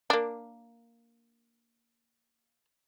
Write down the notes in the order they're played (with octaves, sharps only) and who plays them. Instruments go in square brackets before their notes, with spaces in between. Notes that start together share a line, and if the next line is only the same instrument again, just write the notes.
[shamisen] A#3 D4